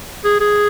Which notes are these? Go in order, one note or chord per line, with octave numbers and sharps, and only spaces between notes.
G#4
G#4